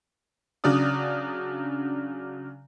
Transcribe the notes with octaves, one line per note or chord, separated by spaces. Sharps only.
C#3 F#3 D4 D5 D#6